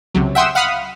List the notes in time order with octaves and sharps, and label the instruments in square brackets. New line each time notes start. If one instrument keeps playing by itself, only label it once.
[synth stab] C#2 C3 F#3
E5 F#5 G5 C6 D#6 E6
F5 F#5 B5 D#6 F6